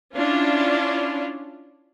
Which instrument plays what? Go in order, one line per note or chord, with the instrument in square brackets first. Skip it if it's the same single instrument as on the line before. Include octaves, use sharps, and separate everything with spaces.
[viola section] C#4 D4 E4 F4